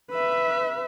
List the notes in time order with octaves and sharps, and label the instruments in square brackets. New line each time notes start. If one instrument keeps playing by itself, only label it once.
[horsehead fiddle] B4 E5